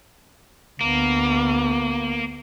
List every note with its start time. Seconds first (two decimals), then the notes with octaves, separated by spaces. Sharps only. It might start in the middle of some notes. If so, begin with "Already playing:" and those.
0.81 D2 A#3 B3